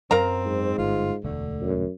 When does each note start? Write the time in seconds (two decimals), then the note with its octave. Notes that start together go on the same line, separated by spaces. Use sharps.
0.11 F#2 F#3 C4 A#4 F5 A#5
0.45 G#2
0.78 G1 F4
1.24 E1 D2 D3 A3
1.62 F#2